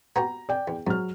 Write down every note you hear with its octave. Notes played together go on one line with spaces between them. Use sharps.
B3 F#4 G4 A#5
D5 G5
E2
G#2 F#3 F6